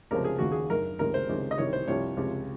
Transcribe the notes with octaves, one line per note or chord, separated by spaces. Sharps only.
C#2 C3 F3 A#4
G#4
D#2 C#3 F3 F#4
G#4
F#2 D#3 A#4
C#2 C3 D#3 A#4
C5
C#2 C3 D#3
D#5
C2 C3 D#3 C#5
C5
C2 C3 F3 C#5
C#2 C3 F3